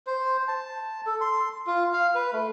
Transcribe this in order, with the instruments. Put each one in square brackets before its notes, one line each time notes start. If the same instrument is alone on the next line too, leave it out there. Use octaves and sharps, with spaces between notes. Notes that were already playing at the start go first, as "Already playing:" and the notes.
[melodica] C5
A5
A4
C6
F4
F5
B4
A3